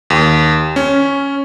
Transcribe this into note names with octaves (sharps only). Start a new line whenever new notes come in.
D#2
C#4